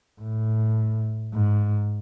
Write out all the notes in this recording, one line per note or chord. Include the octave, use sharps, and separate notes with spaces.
A2
G#2